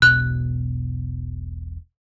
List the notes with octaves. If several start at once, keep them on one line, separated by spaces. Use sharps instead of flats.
E1 B1 B2 F#6